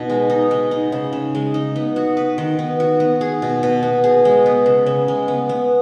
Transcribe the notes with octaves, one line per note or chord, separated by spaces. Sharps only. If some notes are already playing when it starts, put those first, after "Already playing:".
Already playing: B2 D#4
G#3
D#4
G#3
D#4
C#3
C#3
G#3
D#4
B3
F#4
B4
D#3
B3
F#4
B3
G#4
B2
B2
B3
G#4
G#3
B3
C#3
C#3
G#3
B3
B3